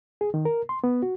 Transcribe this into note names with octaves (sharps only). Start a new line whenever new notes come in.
G#4
D#3
A#4
C6
B3
F#4